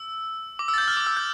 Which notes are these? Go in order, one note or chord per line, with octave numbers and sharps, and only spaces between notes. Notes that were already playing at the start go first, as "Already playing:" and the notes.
Already playing: E6
D6
E6
A6
G6
F6
D6
E6
G6